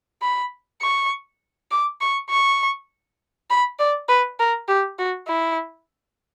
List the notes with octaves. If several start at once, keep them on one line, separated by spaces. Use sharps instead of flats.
B5
C#6
D6
C#6
C#6
B5
D5
B4
A#4
G4
F#4
E4